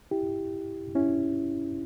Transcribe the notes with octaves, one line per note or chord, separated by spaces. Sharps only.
E4 G4
C#4 E4